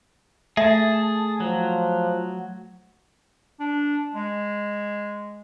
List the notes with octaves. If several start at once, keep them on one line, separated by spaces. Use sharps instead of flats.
A3 G#4 E5 A5
F3 F#3
D4
G#3